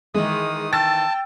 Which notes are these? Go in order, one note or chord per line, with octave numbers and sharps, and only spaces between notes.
D#3 E3 G#3 D#6
G5 A5 E6 A6